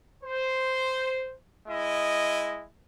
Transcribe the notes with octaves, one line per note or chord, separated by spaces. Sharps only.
C5
G#3 E4 D#5